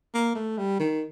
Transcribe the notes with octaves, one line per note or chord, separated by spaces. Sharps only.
A#3
A3
G3
D#3